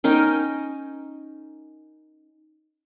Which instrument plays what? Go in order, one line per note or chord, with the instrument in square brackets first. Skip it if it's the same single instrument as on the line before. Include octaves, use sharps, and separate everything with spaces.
[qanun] C#4 D#4 A#4 G5